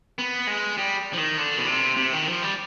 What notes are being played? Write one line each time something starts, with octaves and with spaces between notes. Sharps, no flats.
B3
G#3
G3
F3
D#3
D3
B2
C3
C3
D#3
F3
G3